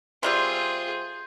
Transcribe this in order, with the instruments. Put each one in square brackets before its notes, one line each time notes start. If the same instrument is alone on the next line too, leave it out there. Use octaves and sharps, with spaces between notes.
[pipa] C3 G3 C4 [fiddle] F4 G#4 [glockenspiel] C6 G6